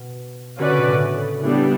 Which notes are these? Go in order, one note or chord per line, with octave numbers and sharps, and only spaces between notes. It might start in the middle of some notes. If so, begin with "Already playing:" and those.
Already playing: B2
D3 C#4 F#4 B4 D5
C#3
B2
A2 C#3
E3 G3 B3 D4